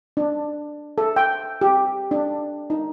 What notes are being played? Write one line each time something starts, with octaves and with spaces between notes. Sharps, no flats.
D4
A4
G5
G4
D4
D#4